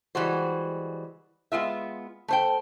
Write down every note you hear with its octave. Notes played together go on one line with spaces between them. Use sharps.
E3 G3 G#3 F#4 C5
G#3 B3 F4 E5
A3 C5 G5